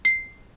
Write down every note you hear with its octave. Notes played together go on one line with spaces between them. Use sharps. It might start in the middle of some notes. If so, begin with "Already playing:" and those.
C7